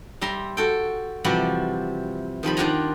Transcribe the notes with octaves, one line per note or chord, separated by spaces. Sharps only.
G3 E5 A#5 C6
F#4 A4 G5
C3 E3 F3 G3 F#4 B5
D#3 F3 G3 B5
D#3 D4 F4 F#5 G#5 A#5